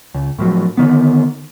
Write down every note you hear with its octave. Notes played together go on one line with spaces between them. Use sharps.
C#2
A2 F3 F#3
D3 D#3 B3